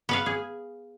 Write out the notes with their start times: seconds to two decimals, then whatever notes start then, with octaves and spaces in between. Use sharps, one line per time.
0.09 B3 B4 F5
0.26 G#4